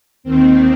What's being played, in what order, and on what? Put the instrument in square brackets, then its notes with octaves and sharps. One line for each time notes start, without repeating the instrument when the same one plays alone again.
[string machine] D#2 D#3 C4